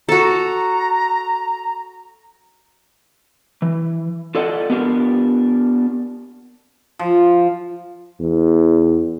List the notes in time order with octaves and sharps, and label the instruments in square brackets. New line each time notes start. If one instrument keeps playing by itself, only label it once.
[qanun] F#4 A4 [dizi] A#5
[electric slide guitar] E3
F4 A4 D5 D#5 F#5
B3 D4 F4 G4 A#4
[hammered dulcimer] F3
[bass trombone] E2